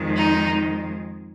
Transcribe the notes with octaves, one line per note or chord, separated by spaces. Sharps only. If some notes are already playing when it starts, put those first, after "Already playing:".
Already playing: F2 D#3 G#3
D#4